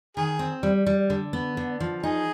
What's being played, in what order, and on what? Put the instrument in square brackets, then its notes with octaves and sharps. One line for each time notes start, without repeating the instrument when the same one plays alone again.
[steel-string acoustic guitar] D#3 [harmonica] G#4
[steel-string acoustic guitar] C4
G3
G3
D3
B3
D3
F3
[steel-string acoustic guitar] D#4 [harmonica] G#4